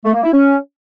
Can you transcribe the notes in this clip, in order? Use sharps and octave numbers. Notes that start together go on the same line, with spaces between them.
A3
A#3
E4
C#4